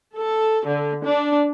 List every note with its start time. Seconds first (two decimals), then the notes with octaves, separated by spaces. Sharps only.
0.17 A4
0.67 D3
1.05 D4